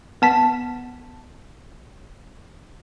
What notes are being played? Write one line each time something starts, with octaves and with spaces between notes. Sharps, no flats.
B3 A5 B6